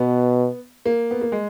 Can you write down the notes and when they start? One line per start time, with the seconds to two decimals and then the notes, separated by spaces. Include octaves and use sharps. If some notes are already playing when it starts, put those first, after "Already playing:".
Already playing: B2 B3
0.86 A#3
1.11 B3
1.21 A#3
1.32 G#3